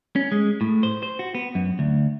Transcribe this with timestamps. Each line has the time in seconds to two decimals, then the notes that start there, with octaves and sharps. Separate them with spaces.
0.16 C#4
0.32 G#3
0.61 A2
0.83 C5
1.03 C5
1.19 F#4
1.35 B3
1.55 F#2
1.79 D2